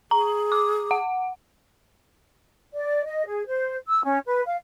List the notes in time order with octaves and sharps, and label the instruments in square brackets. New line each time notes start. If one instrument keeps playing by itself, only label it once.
[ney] G#4 [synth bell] A#5
[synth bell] D6
F#5
[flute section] D5
D#5
G#4
C5
E6
C#4
B4
F5